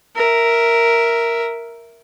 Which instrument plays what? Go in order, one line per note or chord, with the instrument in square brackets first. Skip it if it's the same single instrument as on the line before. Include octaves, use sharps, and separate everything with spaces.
[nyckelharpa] A#4 E5